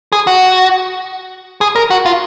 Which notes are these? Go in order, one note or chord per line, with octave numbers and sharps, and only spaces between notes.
G#4
F#4
G#4
A#4
F#4
F4